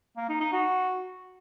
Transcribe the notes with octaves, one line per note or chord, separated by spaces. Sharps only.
A#3
D#4
D#4
F#4